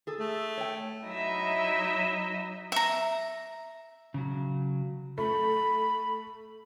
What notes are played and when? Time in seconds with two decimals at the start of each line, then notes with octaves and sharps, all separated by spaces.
0.07 G#4 A4
0.19 A3
0.58 C#5 G5
1.05 F#3 D#4 E4 D#5 E5
2.72 E5 A#5
4.14 C#3 F#3
5.18 A3 B5